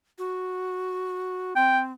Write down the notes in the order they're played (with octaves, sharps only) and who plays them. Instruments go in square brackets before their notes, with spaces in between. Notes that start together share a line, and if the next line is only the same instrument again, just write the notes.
[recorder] F#4
[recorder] C4 [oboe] G5